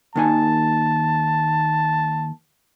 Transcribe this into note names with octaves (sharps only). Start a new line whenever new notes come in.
D#2 D#3 G#5 A5